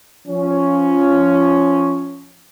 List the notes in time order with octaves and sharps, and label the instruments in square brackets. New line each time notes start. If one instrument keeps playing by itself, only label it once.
[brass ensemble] F3 C#4